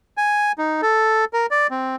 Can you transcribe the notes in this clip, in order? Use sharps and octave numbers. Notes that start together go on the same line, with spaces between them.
G#5
D#4
A4
A#4
D5
C4